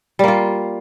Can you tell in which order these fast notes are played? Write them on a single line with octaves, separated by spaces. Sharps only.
G3 A#3 F4